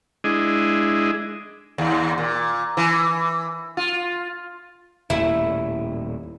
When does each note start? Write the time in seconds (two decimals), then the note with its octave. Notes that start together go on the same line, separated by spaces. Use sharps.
0.24 G#3 D4 E4 G#4 D#5
1.78 D#2
2.18 A#2
2.77 E3
3.77 F4
5.10 D#1 A2 E4